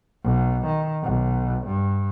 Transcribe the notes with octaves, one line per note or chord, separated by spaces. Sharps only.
B1
D#3
B1
G2